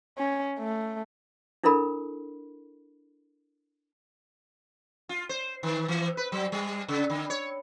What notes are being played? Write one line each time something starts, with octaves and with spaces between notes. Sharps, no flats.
C#4
A3
D4 E4 A4 A#4 B5
F4
C5
D#3
E3
B4
F#3
G3
C#3
D3
C#5